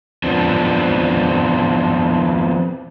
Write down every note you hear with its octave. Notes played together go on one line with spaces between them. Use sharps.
F3 B3 C4 D4